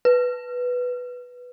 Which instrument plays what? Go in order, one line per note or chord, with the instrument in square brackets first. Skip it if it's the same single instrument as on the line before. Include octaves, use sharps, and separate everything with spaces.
[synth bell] B4